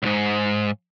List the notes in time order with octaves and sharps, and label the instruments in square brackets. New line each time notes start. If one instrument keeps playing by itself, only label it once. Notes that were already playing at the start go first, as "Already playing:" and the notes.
[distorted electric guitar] C#2 G#2